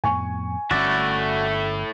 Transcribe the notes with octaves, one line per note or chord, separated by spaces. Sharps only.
F2 A2 B3 G#5 C#6
G1 G2 A3 C#4 E4 F#4 D5